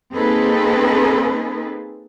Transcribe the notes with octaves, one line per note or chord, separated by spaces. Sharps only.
A#3 C4 D#4 G#4 A4 B4